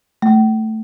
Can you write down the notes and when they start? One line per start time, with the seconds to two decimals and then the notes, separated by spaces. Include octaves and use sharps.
0.22 A3